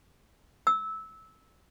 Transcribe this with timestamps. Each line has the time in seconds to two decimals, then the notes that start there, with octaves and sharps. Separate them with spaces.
0.67 E6